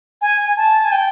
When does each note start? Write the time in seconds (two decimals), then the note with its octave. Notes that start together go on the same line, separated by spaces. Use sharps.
0.22 G#5
0.57 A5
0.85 G#5
0.92 G5